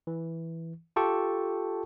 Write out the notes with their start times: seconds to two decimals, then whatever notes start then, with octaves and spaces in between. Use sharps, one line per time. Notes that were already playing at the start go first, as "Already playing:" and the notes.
0.07 E3
0.96 F4 G4 A4 G5 A5 C#6